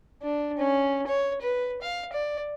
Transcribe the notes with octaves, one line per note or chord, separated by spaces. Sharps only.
D4
C#4
C#5
B4
F5
D5